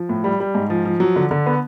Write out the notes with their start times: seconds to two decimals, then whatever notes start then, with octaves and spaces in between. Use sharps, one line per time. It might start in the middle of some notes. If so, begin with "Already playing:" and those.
Already playing: F3
0.09 A2
0.24 G3
0.40 G3
0.55 G#2
0.70 F3
0.85 F3
1.00 F#3
1.16 D3
1.31 D3
1.46 B3